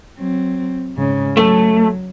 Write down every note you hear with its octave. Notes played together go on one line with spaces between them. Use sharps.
F#3 C4
G#2 C#3
F#3 A3